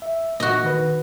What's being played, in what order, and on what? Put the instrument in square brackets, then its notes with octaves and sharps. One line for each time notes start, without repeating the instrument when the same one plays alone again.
[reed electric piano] E5
[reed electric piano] A#2 [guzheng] F#4 D#5
[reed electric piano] D#3 B4